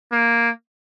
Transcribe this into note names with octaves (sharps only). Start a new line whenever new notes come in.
A#3